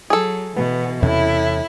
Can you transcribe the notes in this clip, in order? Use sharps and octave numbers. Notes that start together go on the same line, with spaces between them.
F#3 G#4 A4
B2 E3 B3
E2 A2 C3 C#4 E4